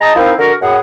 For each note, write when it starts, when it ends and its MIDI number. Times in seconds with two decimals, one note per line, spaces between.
0.01 0.15 56
0.01 0.15 75
0.01 0.15 81
0.01 0.15 82
0.16 0.33 53
0.16 0.33 60
0.16 0.33 63
0.16 0.33 64
0.16 0.33 70
0.39 0.54 50
0.39 0.54 66
0.39 0.54 70
0.62 0.77 42
0.62 0.77 45
0.62 0.77 68
0.62 0.77 78